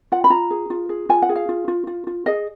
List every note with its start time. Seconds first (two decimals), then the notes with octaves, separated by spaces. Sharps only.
0.12 F4 F#5
0.24 B5
0.30 F4 A#5
0.50 G#4
0.70 F4
0.89 G#4
1.09 F4 G#5
1.22 F#5
1.29 G#4
1.36 F5
1.49 F4
1.68 F4
1.87 F4
2.07 F4
2.26 G#4 D#5